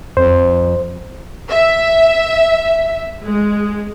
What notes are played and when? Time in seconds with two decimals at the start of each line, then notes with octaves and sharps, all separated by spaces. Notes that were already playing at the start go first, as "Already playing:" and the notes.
0.17 F2 C5
1.48 E5
3.24 G#3